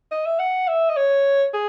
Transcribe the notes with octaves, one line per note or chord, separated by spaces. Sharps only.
D#5
E5
F#5
E5
D#5
C#5
G#4